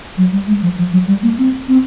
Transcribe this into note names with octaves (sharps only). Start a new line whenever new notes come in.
F#3
G3
G#3
F3
F3
F#3
G3
A#3
C4
C4